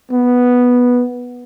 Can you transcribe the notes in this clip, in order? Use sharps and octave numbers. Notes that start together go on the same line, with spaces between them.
B3